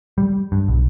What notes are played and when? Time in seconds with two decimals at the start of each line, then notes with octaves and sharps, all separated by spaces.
0.18 G3
0.52 G2
0.68 B1